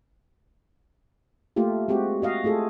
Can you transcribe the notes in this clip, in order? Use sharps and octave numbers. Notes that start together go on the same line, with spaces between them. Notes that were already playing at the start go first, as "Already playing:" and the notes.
A3 A#3 F4 G4
G#3 C4 F#4 G4
F#4 D#5 F5
A3 F4 G#4 A4